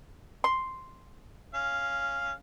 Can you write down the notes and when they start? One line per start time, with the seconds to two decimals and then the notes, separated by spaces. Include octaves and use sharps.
0.44 C6
1.54 C#4 F5